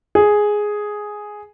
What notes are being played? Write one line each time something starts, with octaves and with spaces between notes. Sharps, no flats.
G#4